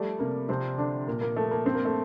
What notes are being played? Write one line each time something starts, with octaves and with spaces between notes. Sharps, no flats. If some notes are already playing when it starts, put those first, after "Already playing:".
Already playing: F3 G3 A3
C3 A#3
C3 F3 C4
D3 D4
A#2 A#3
A#3
F3 A3
A#3
G2 C4
A#3
A3